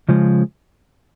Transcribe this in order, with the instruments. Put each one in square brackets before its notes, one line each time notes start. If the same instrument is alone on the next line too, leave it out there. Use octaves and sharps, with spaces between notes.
[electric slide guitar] C#3 F3 G#3